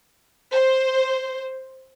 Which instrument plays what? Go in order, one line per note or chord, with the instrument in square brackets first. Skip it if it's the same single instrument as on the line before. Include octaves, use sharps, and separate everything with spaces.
[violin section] C5